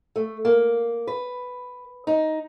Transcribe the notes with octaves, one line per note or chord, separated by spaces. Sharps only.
A3
A#3
B4
D#4